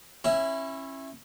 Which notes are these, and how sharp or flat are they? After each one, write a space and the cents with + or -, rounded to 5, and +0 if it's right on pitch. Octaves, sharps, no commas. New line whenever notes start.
C#4 -30 E4 +5